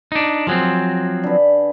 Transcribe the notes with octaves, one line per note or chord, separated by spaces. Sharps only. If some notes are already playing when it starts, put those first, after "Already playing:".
D4 D#4
F3 F#3 C4 G#4
D3 B4